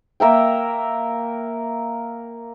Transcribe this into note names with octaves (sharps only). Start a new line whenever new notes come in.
A#3 A#4 E5 G5